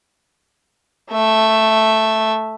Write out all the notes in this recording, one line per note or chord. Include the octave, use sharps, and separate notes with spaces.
A3 E5